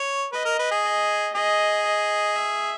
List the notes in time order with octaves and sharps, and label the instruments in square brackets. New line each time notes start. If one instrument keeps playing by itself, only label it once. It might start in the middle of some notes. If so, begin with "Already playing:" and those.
Already playing: [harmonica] C#5
[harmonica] B4 [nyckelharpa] D#5
[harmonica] A#4
B4
G#4
[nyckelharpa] D#5
[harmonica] G#4 [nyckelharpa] D#5
[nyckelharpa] D#5
E5